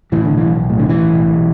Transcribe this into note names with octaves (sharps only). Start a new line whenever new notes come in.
A2 E3
D3
B1
E3
B1
A2
D3
A2 E3
B1
B1